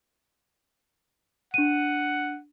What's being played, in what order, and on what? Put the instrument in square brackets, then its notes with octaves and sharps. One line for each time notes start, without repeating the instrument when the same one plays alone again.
[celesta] D4 D#7 [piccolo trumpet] F#5